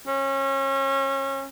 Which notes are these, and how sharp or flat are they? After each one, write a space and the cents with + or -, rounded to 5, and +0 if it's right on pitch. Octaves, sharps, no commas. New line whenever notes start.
C#4 -30